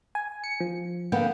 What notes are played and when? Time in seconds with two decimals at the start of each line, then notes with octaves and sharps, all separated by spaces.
0.15 G#5
0.44 C#7
0.60 F3
1.12 D3 A#3 B3 G5